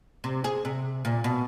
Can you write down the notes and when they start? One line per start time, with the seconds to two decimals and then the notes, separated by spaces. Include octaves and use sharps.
0.24 C3
0.44 G#4
0.65 C3
1.05 A#2
1.24 B2